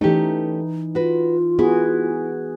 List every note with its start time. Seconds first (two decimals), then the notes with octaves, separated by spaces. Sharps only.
0.01 E3 A3 C#4 D#4 G4
0.95 F4 F#4 B4
1.59 B3 E4 F#4 G#4